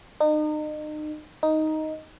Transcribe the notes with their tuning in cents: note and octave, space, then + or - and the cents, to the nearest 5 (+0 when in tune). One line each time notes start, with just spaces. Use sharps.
D#4 -35
D#4 +5